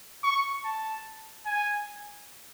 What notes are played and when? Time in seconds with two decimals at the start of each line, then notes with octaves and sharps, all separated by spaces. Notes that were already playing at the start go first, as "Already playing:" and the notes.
0.24 C#6
0.65 A5
1.46 G#5